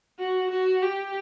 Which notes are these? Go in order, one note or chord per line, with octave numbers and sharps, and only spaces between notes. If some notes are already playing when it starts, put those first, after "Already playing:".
F#4
F#4
G4